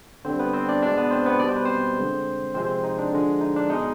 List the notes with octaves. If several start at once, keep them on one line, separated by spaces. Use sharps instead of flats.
D3 G3 C4 C5
B3 B4
C4 C5
D4 D5
B2 G#3 D4 D5
B3 B4
C4 C5
B3 B4
B2 G3 D5
C5
B4
C4 C5
D3 G#3
C3 F3 G#3 C4 C5
C4 C5
D#4
D4
D3 F3 G#3
D#4
D4
B2 G#3 D#4